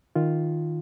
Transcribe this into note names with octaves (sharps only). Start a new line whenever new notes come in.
D#3 F4